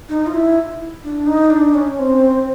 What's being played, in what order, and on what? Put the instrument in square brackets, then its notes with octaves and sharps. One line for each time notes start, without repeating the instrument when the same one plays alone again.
[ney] D#4
F4
E4
D4
D#4
D4
C#4
C4